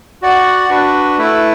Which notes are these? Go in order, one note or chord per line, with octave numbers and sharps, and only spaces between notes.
F#4 D5 F#5
D4 F#4 B4
A3 E4 B4